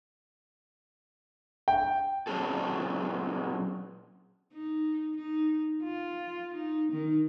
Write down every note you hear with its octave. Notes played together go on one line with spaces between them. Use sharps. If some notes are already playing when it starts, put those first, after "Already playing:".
G5
A#2 F#3 C4 C#4 G#4 A4
D#4
D#4
F4
D#4
D#3